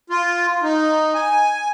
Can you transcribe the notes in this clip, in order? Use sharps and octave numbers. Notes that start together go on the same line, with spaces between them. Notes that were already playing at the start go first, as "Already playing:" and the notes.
F4
D#4
G#5